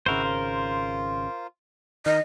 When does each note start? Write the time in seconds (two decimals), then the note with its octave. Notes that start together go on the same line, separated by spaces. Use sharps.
0.06 G#1 C#3 E4 F#4 A#4 C5
0.24 F4
2.06 D#3 A#4 D#5